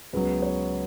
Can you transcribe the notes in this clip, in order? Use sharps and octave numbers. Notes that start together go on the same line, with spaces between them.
C#2 C#3 F#3 B3 B4
C#5